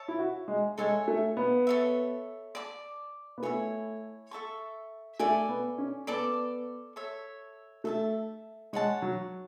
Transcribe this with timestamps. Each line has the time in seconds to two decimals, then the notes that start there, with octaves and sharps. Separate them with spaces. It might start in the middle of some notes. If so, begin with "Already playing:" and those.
Already playing: C#5 E5 A5
0.08 E4
0.19 F#4
0.48 G#3
0.78 G#3 A4 C#5 E5 G#5
1.08 A3
1.37 B3
1.67 A4 C#5 E5
2.55 D5 A5 D6
3.38 B3
3.42 A3 E4 A4 C#5 G#5
4.31 A4 E5 A5 C#6
5.19 A3 A4 D5 G#5
5.49 B3
5.78 C#4
6.07 B3 A4 D5 A5 D6
6.96 A4 C#5 E5
7.84 A3 A4 E5 A5
8.73 G#3 C#5 F#5 A5
9.02 F#3